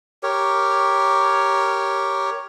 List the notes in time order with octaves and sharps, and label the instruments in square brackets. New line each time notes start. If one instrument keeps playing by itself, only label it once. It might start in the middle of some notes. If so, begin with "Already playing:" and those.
[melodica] G4 A#4 C#5